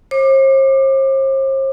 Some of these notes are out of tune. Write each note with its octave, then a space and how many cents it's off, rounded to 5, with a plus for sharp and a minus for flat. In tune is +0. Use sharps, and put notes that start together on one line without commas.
C5 +45 D6 +25